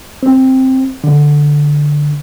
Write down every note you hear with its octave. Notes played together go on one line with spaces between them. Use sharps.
C4
D3